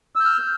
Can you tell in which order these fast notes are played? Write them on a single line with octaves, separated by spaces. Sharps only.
E6 G6 F6